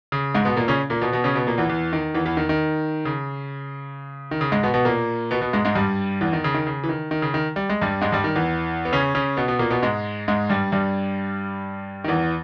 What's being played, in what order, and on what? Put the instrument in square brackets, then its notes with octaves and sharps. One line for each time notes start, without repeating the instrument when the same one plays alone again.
[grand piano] C#3
G#2 G#3
B2 B3
A#2 A#3
C#3 C#4
A#2 A#3
B2 B3
B2 B3
C#3 C#4
B2 B3
A#2 A#3
E2 E3
E2 E3
D#3
E2 E3
E2 E3
D#3
D#3
C#3
D#3
C#3
G#2 G#3
B2 B3
B2 B3
A#2 A#3
B2 B3
B2 B3
G#2 G#3
G#2 G#3
G2 G3
E2 E3
D#3
C#3
D#3
C#3
E3
D#3
D#3
C#3
D#3
G3
G#3
G2 G3
G#2 G#3
G2 G3
D#3
E2 E3
B3
C#3 C#4
C#3 C#4
B2 B3
B2 B3
A#2 A#3
B2 B3
G#2 G#3
G#2 G#3
G2 G3
G2 G3
D#3
E2 E3